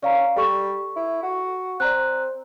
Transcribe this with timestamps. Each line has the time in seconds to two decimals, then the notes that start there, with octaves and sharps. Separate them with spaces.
0.03 C#4 D5 F5 A#5
0.36 G3 A4 C#6
0.96 E4
1.23 F#4
1.80 C4 D5 A#5 F#6